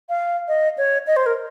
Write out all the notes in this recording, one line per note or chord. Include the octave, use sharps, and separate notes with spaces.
F5
D#5
C#5
D#5
C5
A#4